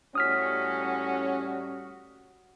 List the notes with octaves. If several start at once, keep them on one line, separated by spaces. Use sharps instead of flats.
A2 G3 C#4 F#4 D#6 F6 B6